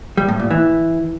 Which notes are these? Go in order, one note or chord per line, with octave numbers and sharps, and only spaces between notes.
G3
A2
A#2
E3